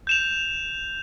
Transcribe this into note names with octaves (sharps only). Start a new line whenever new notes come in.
G6 E7 F7